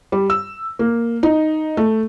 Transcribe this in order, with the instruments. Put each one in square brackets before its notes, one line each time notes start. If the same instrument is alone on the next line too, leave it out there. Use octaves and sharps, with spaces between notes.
[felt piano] G3
E6
A#3
D#4
A3